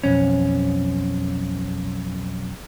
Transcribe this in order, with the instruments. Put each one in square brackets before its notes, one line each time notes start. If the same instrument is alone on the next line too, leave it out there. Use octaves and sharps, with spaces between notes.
[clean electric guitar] B1 F2 C#4